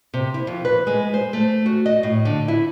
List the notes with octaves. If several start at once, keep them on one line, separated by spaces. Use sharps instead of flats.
C3
E4
F2
B4
G#3
C5
A3
F#4
D#5
A2
D3
E4